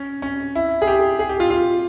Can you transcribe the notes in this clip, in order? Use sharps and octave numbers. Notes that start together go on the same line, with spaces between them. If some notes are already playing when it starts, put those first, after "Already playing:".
Already playing: C#4
C#4
E4
G#4
G4
G#4
G4
F4
F4